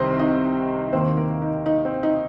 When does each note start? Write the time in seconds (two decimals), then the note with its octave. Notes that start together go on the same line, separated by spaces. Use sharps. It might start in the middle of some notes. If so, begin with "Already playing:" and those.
Already playing: C2 C3 D#3 C4 C5 D#5
0.19 D#4 D#5
0.93 D#2 D#3 A#3 C4 C5
1.17 A#3 A#4
1.42 D#4
1.66 D#4
1.85 C4
2.03 D#4